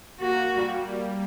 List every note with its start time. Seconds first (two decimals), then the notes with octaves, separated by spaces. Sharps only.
0.20 A#3 F#4
0.54 G3
0.89 G3